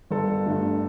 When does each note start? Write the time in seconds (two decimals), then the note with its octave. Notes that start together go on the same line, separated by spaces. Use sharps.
0.11 G1 A4
0.46 G2 D3 A3